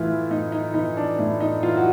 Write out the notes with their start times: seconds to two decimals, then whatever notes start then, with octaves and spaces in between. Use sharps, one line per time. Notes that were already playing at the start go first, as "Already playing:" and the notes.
Already playing: A2 E3 E4 F4
0.30 A2 D#4
0.52 D#4
0.74 E3 D#4
0.97 D4
1.18 A2 D#4
1.40 D#4
1.63 E3 F4
1.77 F#4